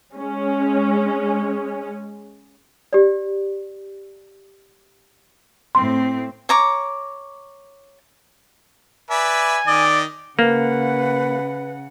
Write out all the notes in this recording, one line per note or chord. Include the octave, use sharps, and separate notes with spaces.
G#3 C#4
G4 D5
A2 C4 C6
C#5 A#5 D6
B4 D5 E5 G#5
D#3 D5 D#5
C#3 A#3 B4 F#5